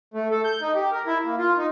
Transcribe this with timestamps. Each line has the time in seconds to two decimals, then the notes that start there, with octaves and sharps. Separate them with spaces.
0.14 A3
0.31 A4
0.44 G6
0.61 D#4
0.75 G4
0.92 A#4
1.07 E4
1.25 A#3
1.38 F4
1.58 D#4